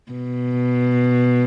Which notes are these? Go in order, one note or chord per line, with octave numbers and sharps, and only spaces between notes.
B2